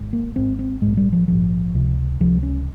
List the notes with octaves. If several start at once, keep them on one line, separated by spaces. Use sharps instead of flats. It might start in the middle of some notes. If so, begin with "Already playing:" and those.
Already playing: G#1 G#2
A#3
G#1 G#2 C4
C4
A#1 G#2 G#3
G3
F3
A#1 G#2 F3
C#2 C3
C#2 C3 F3
C#4